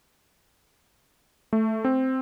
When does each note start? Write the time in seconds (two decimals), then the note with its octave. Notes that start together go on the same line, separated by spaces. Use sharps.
1.53 A3
1.85 C4